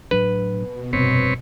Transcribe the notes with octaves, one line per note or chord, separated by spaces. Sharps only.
A2 F#3 D4 B4
B2
F1 G2 C3 C4 B4 C#5